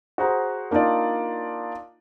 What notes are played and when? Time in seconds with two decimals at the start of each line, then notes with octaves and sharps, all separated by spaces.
0.18 F#4 G#4 C5 F#5 A#5
0.71 A#3 D4 D#4 F4 D5